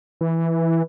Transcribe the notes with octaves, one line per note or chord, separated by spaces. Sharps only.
E3